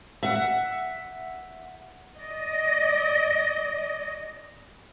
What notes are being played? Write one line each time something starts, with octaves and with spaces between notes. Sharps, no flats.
E5 F#5
D5 D#5